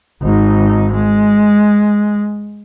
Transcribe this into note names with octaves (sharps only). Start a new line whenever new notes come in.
G#1 D#4
G#3